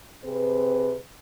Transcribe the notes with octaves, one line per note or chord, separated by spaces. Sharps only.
C3 C4 G#4 B4